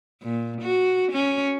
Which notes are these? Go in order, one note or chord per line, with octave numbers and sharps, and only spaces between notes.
A#2
F#4
C#4